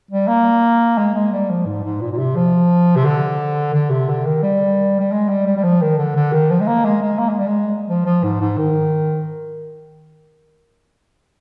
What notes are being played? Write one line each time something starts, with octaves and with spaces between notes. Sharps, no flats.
G3
A#3
G#3
G#3
G3
F3
G#2
G#2
A#2
A#2
C3
F3
C3
D3
D3
C3
D3
D#3
G3
G3
G#3
G3
G3
G3
F3
D#3
D3
D3
D#3
F3
G#3
A#3
G#3
G#3
A#3
G#3
G3
G#3
F3
F3
G#2
G#2
D#3